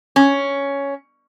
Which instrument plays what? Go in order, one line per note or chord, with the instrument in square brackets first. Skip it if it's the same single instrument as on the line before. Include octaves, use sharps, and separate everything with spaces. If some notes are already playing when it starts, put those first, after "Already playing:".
[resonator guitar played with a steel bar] C#4